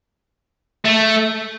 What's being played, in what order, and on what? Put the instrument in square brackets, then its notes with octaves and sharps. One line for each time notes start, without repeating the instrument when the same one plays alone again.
[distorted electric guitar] A3